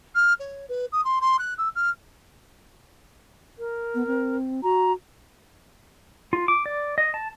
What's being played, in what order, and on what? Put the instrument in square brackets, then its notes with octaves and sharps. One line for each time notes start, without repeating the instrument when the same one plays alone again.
[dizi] F6
C#5
B4
D#6
C6
C6
F#6
E6
F6
[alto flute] A#4
[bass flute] B3
C4
[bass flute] F#4 [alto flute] A#5
[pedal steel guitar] F4
D6
D5
D#5
A5